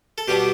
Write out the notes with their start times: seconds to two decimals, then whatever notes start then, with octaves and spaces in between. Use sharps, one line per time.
0.18 A4
0.28 B2 G3 B3 D4 G4